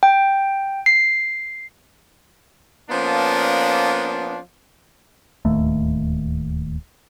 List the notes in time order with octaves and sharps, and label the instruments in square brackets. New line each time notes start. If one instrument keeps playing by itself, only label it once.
[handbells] G5
C7
[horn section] F3 A#3 B3 C#4 D4
[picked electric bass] D1 D#2 A3